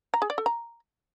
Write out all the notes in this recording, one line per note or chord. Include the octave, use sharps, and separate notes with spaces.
A#5
G#4
D5
A4
A#5